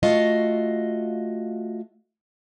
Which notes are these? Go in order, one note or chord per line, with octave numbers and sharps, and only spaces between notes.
A3 F4 F#4 D#5 F5